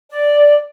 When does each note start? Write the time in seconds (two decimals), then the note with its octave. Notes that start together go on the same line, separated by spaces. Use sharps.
0.11 D5